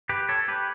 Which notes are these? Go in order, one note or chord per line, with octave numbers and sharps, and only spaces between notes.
G4 B4
A4 C#5
G4 B4